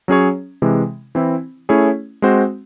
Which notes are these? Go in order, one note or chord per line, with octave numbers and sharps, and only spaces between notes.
F#3 C#4 G#4 C#5
C3 E3 G#3
E3 C4 E4
A3 C#4 E4 G#4 C#5
G#3 C4 F#4 C5